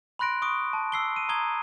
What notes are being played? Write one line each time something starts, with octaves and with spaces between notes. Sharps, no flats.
B5 C6 F#6 A#6 D7
C#6 D#6 D7
A5
E6 C7 G7
D#7
A#5 D#6 G#6 G7